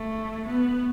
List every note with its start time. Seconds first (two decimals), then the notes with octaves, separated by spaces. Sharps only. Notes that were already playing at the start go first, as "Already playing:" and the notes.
Already playing: A3
0.47 B3